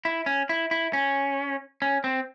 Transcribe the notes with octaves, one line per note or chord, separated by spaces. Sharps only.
E4
C#4
E4
E4
C#4
C#4
C4